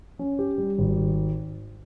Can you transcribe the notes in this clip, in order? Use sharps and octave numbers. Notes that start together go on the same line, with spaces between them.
C#4
G4
G3
G#1